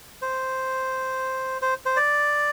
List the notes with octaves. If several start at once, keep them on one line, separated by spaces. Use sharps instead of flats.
C5
C5
C5
D5